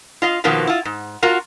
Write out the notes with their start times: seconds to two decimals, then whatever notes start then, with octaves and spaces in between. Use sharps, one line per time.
0.22 F4 D#5 F5
0.44 B2 D#3 F3 A#3 B3
0.67 E4 F4
0.85 G#2
1.23 F4 F#4 A#4